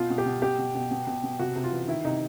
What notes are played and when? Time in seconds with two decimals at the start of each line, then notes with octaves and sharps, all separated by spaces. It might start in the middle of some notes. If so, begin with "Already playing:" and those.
Already playing: B2 F4
0.10 B2
0.18 G4
0.26 B2
0.42 B2 G4
0.58 B2
0.75 B2
0.91 B2
1.07 B2
1.24 B2
1.39 C3 F#4
1.56 C3
1.64 F4
1.72 E3
1.88 D#3 E4
2.05 C3 D#4